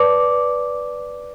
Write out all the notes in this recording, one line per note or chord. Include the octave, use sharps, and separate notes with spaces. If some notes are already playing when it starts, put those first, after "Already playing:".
Already playing: B4 D5 A5 D6